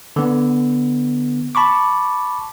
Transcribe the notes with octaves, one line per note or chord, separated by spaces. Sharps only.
D3 B3
A5 B5 C#6 D6